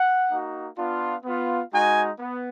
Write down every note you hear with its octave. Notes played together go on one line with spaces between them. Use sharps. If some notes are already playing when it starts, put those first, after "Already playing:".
Already playing: F#5
A#3 D#4 F#4
B3 D4 F4
B3 F4
G#3 D#4 F#4 G#5
B3